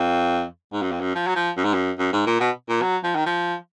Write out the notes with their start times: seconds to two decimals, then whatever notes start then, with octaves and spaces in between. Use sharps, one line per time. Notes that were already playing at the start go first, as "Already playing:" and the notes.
Already playing: F2
0.73 G#2
0.82 F#2
0.91 F2
1.00 F#2
1.15 F3
1.27 F#3
1.35 F3
1.57 F#2
1.64 G#2
1.74 F#2
1.99 F#2
2.13 G#2
2.27 A#2
2.40 B2
2.69 A#2
2.82 F#3
3.04 F3
3.15 D#3
3.26 F3